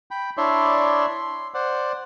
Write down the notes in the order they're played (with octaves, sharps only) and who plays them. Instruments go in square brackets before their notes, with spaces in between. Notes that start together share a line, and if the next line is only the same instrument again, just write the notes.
[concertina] G5 B5
D4 E4 C#5 D5 E5 C6
C6
C5 D5 F#5